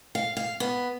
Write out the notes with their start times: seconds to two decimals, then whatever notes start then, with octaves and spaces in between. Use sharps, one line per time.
0.15 F5
0.37 F5
0.60 B3